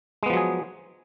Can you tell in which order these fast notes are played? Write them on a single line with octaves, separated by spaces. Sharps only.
G#3 B3 F3 F#3 G#4